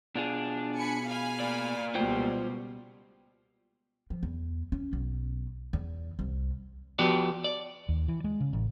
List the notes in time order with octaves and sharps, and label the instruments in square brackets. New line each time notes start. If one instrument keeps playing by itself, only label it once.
[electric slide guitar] B2 F4 G#4 [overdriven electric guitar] D4
[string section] G#5 B5 C#7
F5 G#5 B5
[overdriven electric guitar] A#3 D5
[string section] C#2 B2 G3 [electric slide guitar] F4 C5 G5
[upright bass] F3
E2
C#4
B1
E2
C2
[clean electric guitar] F3 B3 F#4 G4 D5
D5
[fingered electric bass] D#2
E3
G#3
C#3
A1